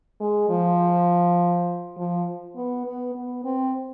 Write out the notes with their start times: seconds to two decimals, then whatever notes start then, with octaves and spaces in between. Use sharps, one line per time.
0.20 G#3
0.49 F3
1.97 F3
2.56 B3
2.86 B3
3.15 B3
3.44 C4